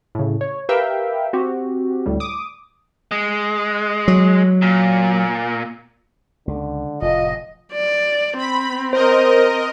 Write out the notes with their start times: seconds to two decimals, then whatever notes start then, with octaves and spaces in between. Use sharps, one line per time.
0.15 A2 C#3
0.41 C#5
0.69 G4 A#4 B4 E5 F5 G5
1.33 C4 F#4 G4
2.06 D2 A2 G3
2.20 D6 D#6
3.11 G#3
4.08 F#3
4.62 A#2
6.47 C#2 D3
7.02 F1 A2 F4 D#5
7.72 D5
8.38 C4 B5
8.93 A#4 C5 D#5